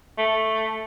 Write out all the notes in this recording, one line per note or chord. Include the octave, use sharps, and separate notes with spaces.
A3